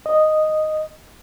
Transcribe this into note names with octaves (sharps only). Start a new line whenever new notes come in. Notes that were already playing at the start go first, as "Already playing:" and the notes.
D#5